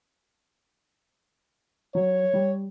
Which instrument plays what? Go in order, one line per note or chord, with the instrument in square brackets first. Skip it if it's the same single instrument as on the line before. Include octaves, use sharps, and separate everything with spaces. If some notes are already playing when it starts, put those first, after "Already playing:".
[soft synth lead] F#3 [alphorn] C#5
[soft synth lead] G3